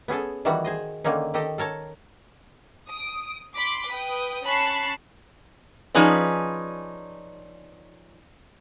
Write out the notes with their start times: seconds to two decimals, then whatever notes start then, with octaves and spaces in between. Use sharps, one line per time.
0.08 B3 C#4 G#4 A4
0.45 D#3 E3 G3 F#4
0.65 G#4 C5 D#5
1.04 D3 D#3 A#3 C#4 D#4
1.34 D#3 G4 A4 D#5 G5
1.58 A4 A#4 C#5 A5
2.90 D#6 D7
3.56 B5 C6 D6 B6
3.91 B4 G5 D#6
4.46 C#4 A5 B5 C#6 F#6 C7
5.95 F3 C#4 D#4 G#4 B4 D5